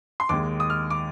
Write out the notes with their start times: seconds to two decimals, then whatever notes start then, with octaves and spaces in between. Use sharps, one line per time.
0.20 C6
0.29 D#2 D#3 G#3 D6
0.60 D#6
0.70 F6
0.90 D6